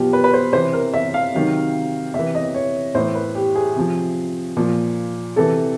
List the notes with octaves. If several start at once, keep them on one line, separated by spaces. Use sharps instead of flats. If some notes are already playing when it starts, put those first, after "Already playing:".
Already playing: B2 F#3 F4 G4
B4
B4
C5
C3 E3 C5
A#4
E5
F5
C3 D#3 F#3
C3 E3 E5
D#5
C#5
A2 E3 C5
B4
G4
G#4
C3 F3
A#2 F3
C3 E3 A4